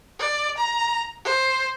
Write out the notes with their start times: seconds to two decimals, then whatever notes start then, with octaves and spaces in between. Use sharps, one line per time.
0.19 D5
0.58 A#5
1.24 C5